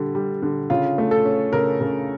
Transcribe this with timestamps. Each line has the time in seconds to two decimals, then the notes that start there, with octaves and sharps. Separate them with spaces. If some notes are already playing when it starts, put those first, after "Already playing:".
Already playing: D3 G3
0.15 G3
0.42 D3
0.70 C#3 F4
0.98 A3
1.11 A4
1.25 C#4
1.53 C#3 A#4
1.81 C#3